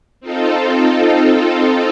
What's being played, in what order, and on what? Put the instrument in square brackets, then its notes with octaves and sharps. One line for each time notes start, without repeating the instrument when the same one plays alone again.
[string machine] C4 D#4 F4 A4